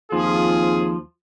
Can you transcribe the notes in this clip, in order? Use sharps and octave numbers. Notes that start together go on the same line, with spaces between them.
D#2 F3 C4 F4 G#4